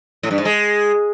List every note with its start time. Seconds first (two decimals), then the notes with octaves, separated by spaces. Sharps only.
0.23 A2
0.31 G2
0.38 G#2
0.45 G#3